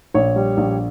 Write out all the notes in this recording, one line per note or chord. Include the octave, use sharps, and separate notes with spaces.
A#1 C#5
G3
A#1